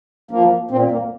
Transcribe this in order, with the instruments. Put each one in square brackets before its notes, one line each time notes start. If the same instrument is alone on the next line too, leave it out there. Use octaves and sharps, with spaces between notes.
[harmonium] F3 A#3
A#2 C4
A#3